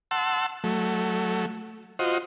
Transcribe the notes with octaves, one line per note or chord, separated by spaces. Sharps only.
F#5 A5 C6 E6
F#3 A3
F4 F#4 C5 D#5